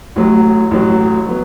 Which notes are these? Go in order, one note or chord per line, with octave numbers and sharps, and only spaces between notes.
A1 A2 F#3
A1 A2 F#3
F#3 B3